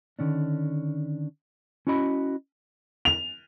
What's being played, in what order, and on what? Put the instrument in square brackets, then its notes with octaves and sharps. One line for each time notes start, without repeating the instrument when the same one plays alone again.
[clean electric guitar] D3 D#3 C#4 D4
C#4 E4 F#4 D#5 B5
[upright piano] F7